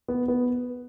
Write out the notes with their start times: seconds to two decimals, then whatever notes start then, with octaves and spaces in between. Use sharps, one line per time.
0.08 B3
0.28 B3